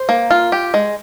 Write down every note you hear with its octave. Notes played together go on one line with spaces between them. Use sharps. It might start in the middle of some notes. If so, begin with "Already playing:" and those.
Already playing: C5
A#3
F4
G4
G#3